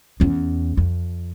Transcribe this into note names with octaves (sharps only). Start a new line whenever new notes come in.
E2 C#4
F2